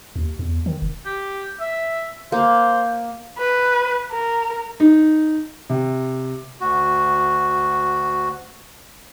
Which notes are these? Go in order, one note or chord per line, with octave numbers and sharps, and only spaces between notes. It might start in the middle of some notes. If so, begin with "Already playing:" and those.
D#2
E2
D#3
F1
G4
E5
A#3 C5
B4
A#4
D#4
C3
D2 F#4